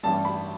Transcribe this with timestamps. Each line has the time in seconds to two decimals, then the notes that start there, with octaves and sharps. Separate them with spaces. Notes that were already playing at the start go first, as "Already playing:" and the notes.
0.03 A1 G2 G3 A5
0.25 B5